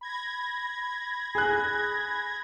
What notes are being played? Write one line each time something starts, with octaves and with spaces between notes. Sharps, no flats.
B5 G#6 A#6
G#4 F#6